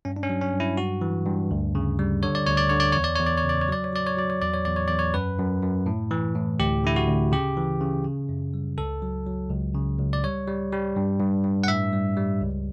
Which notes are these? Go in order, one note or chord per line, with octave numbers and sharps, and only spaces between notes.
G2 C#4
D4
C#4
F#3
C#4
G2
E4
G2 F#4
E3
G2
D2
C#3
G3
D3 C#5
D5
D2 C#5
D5
D3 C#5
D5
E2 C#5
D5
E2 C#5
D5
C#5
C#3 D5
C#5
F#3 D5
C#5
F#3 D5
C#5
F#3 D5
C#5
E2 D5
C#5
E2 D5
C#5
E2 D5
C#5
F#2 B4
F#2
F#2
A2
E3
A2
D2 G4
D3 E4
F#4
D2
C#3 G4
E3
C#3
C#3
F#2
G3
C#2 A4
F#3
F#3
C#2
C#3
C#2
D5
G3 C#5
G3
G3
G2
G2
G2
F#5
A2 E5
G3
G3
C#2